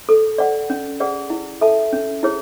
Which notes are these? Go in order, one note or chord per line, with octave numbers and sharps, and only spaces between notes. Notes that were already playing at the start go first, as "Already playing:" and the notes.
A4
D5 F#5
C#4
G#4 D5 F#5
E4
A4 E5 A5
C#4
E4 G#4 C#5